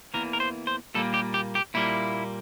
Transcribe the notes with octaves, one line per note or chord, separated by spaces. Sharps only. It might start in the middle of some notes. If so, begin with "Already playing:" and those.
E2 E3 A#3 A#4
A#4
C5
C5
A#2 G3 A#3 A4
G4
G4
G4
A#2 G3 A#3 E4